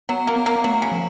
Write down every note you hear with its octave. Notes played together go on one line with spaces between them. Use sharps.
F#3 B3
A#3
B3
A#3
F#3 A3
C#3
F3